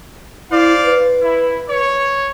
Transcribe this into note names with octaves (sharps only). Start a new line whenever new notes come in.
E4 C5 D5 F5
B4
E4
C#5